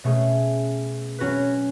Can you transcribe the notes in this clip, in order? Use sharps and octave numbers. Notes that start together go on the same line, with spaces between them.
B2 A3 C#4 G#4
F#3 C#4 F#4 B4